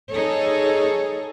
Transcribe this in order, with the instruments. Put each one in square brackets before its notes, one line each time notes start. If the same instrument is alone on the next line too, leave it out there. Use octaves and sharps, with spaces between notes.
[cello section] D#4 G#4 A4 C#5